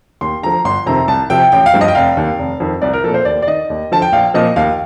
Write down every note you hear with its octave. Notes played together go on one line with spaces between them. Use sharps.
D#2 C6
D3 F3 A#5
G1 C6
F2 C3 D#3 A#5
C2 A5
C3 F3 G5
A1 G5
F5
G2 F3
D#5
G5
F1 F5
D#2 D#3
F1
F2 D#3
C2 D5
A#4
A#2 F3 A4
C5
D#2 D5
D5
D#3 D#5
D#2
D3 F3 A5
G5
A#1 F5
A#2 F3 D#5
D#2 F5